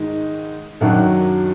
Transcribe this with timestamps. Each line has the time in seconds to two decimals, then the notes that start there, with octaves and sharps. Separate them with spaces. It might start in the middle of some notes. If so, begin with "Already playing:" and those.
Already playing: G#2 D#3 G#3 D#4
0.81 F#2 D#3 F#3 D4 F#4